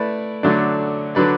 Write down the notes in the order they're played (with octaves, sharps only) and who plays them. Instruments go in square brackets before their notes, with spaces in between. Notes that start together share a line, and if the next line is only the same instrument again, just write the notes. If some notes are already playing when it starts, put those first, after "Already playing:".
Already playing: [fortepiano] A3 E4 B4 D5
D3 F#3 A3 D4
D3 F#3 D4 B4 D5